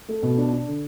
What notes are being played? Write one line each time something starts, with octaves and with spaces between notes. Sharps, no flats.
A3
B2
D4
D4
D3